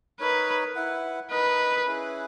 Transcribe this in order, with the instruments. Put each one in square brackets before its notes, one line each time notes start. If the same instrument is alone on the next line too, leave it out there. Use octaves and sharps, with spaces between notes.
[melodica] D#4 A#4 C#5 [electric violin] B4
[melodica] E4 B4 F#5
[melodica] D#4 A#4 D#5 [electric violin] B4
[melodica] C#4 E4 G#4 B4